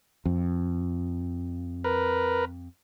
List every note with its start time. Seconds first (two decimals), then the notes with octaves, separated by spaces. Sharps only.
0.25 F2
1.84 A#4 B4